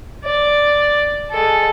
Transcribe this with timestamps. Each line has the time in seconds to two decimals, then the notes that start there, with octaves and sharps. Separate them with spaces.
0.24 D5
1.30 G#3 A4